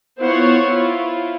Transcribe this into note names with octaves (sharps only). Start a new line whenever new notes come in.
B3 E4 F4 C5 C#5 F#5
E4 F4